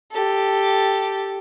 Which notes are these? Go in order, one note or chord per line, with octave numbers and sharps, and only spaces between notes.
G4 A4